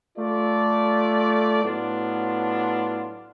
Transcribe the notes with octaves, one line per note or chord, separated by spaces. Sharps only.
A3 F4 A4 D5
A2 F#3 B3 D4 F4